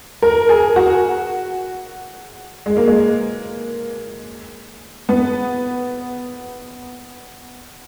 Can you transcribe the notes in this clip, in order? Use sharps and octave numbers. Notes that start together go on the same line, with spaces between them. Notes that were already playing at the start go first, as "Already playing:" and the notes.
A#4
G#4
F#4
G#3
A#3
G#3
B3